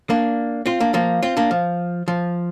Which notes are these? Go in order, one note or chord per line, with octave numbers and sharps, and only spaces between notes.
A#3 D4
C4 F4
A#3 D4
F3 A#3
C4 F4
A#3 D4
F3
F3